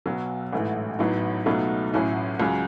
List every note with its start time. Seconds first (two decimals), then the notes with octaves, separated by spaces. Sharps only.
0.06 B1 B2 F#3
0.53 A1 G#2 E3 A3
0.99 A1 A2 F#3 B3 D#4
1.46 C#2 B2 F#3 A3 D#4
1.93 A1 A2 F#3 C#4 E4
2.40 C#2 C#3 F#3